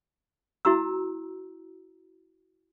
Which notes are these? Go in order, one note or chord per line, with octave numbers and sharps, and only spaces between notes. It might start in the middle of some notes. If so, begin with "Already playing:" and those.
E4 F#4 A#5 E6